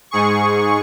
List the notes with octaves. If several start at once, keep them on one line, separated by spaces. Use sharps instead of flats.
G#2 G#4 C#6